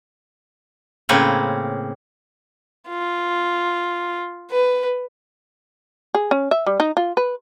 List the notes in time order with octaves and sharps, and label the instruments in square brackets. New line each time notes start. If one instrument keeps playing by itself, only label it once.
[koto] A2 C#3 A#3 C4 B4 C#5
[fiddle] F4
B4
[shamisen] G#4
C#4
E5
G3
D#4
F4
B4